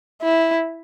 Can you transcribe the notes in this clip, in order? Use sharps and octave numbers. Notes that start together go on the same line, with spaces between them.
E4